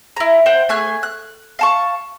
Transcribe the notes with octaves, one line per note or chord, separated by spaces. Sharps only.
E4 A#5
C5 F#5 G5
A3 G#4 G#5 F#6
F#6
F5 A5 C#6